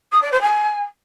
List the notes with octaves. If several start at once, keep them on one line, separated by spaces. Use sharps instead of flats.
D#6
D5
C5
G#5